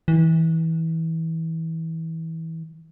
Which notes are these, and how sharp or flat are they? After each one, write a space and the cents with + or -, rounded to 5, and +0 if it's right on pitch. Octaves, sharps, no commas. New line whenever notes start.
E3 -25